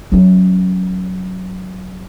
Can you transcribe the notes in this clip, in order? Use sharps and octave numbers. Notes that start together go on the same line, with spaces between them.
F#3 C#4